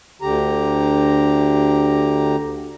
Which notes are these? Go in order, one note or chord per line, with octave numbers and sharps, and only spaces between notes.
D2 D3 G4 A#5